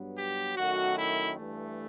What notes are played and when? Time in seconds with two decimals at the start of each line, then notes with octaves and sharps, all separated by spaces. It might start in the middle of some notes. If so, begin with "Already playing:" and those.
Already playing: G2 F#3 B3
0.17 G4
0.56 F#2 D#3 A3 F#4
0.96 E4
1.36 G2 E3 A3